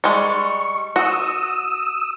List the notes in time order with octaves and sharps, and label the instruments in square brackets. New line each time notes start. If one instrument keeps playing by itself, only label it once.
[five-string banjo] G3 G#3 [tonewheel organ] C#6
[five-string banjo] F#4 [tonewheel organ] D#6 E6